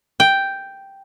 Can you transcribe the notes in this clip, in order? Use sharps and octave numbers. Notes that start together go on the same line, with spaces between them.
G5